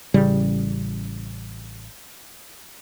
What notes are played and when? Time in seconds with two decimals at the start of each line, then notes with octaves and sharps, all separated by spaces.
0.14 A1 C#3 G3